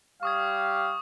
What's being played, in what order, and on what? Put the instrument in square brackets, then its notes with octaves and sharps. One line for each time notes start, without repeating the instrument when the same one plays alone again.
[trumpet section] G3 G4 F5 [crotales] C#6 D#6 G#6